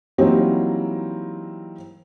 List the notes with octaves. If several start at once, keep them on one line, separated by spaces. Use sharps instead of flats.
E3 F#3 G3 A#3 C4 D#4